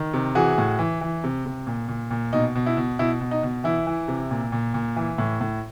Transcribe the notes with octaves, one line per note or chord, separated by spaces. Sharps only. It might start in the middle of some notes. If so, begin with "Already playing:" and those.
Already playing: D#3
C3
E3 F#4 G#4
A2
E3
E3
C3
C3
A#2
A#2
A#2
B2 D#4
B2
E4
B2
B2 E4
B2
D#4
B2
E3 E4
E3
C3
A#2
A#2
A#2
E3
A2
A2